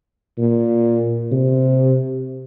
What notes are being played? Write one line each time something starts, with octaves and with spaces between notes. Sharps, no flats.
A#2
C3